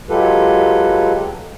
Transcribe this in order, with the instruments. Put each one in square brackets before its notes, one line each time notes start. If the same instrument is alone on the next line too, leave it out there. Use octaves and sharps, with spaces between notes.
[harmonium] F#3 G#3 F4 G4 A4 B4